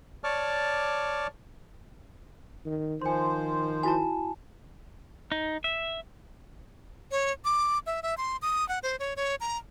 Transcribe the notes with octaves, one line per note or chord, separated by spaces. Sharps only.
C#5 D5 A5 C#6 D6 F6
D#3
D#3 F3 C5 G#5 C6
E4 F#4 G#5 A5 B5
D#4
E5
C#5
D6
E5
E5
C6
D#6
F#5
C5
C#5
C#5
A#5